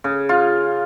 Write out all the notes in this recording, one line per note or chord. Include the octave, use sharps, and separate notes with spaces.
C#3
F4